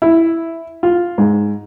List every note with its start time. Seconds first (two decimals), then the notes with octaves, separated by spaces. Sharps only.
0.02 E4
0.83 F4
1.18 G#2